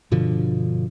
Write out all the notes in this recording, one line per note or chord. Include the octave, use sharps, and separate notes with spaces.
G2 B2 D3 F3